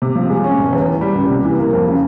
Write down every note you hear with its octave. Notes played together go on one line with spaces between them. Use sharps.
C3
F3
G#3
C#4
E1
E2
E3
G3
C#2
C3
E3
A#3
F2
C#3